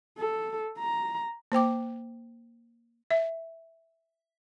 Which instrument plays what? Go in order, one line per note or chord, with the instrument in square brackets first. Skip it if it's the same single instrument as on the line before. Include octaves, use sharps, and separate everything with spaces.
[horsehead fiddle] A4
A#5
[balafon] A#3 C5 G5 D6
E5